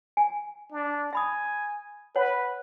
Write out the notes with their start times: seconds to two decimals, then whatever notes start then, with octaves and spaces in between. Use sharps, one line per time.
0.17 G#5
0.72 D4
1.13 E5 G#5 B5 D#6
2.16 B4 C#5 F#5